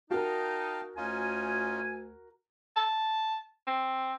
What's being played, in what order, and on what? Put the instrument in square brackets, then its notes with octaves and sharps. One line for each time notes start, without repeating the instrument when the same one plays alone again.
[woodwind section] D#4 [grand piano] F#4 A#4 [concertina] F5 G5 A5
[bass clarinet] D2 [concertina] C#4 D#4 F4 [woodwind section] G#5
[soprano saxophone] A5
C4